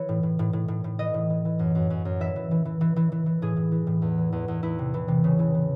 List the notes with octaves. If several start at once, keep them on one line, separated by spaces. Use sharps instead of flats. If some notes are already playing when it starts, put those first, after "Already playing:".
Already playing: E3 C#5
A2
A2
A2
A2
A2
A2
E3 D#5
A2
E3
E3
F#2
F#2
F#2
F#2
E3 E5
E3
E3
E3
E3
E3
E3
E3
A2 G#4
A2
E3
A2
E2
E3
E2
E2
E2 E4
C3
E3
C3
C#3
E3
E3